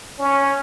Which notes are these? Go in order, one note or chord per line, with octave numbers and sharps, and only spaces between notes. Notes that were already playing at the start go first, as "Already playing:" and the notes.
C#4